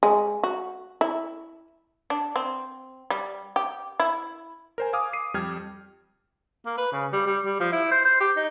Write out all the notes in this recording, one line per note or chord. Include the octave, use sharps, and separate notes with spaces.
G#3
F#4
E4
D4
C4
G3
G4
E4
A#4 C5 G#5
F5 G#5 D6 D#6 F6
C7 D#7
F2 G3 G5 F6 G#6
A#3
B4
C#3
G3
G3
G3
F3
E4
C5
C5
G4
D#4